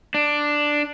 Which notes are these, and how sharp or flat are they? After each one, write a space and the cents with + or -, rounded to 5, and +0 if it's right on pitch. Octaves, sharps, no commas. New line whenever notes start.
D4 +5